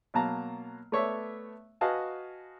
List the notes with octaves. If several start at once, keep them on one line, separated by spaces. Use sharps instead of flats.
B2 F#3 A#3 A5 A#5
A3 B3 C#5 D5 E5
F#4 B4 D#5 F5 G#5 A5